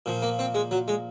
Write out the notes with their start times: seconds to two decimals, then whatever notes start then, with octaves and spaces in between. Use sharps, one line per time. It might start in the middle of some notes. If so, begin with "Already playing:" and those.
0.06 A#2 F3
0.22 A#3
0.39 C4
0.55 G#3
0.71 F#3
0.88 G#3